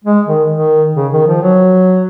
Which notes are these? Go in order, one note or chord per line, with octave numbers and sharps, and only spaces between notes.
G#3
D#3
D#3
C#3
D#3
F3
F#3